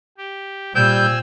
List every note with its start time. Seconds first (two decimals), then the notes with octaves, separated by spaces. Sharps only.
0.18 G4
0.75 A#2 G3 C4 G#5 E6 G6